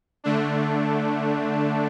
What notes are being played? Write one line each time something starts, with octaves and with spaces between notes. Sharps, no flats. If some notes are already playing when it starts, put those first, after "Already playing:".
D3 A3 D4